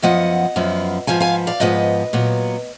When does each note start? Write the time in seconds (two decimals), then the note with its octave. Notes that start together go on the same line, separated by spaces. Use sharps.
0.02 F#2 F3 B3 D#5 F#5
0.56 F#2 F3 B3
1.07 G#2 F3 B3 F5 G#5
1.20 F5 G#5
1.47 D5 F5
1.60 G#2 F3 B3 B4 D#5
2.13 A#2 F#3 B3